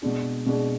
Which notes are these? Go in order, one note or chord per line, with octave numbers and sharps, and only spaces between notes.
B2 G#3 D4 G#4
B2 G#3 D4 G#4